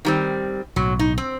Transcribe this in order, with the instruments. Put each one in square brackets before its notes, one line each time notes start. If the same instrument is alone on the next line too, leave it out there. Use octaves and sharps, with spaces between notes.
[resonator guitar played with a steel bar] D#3 G3 C4
[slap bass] B1 A2 [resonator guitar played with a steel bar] F#3
[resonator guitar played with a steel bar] D#4
C4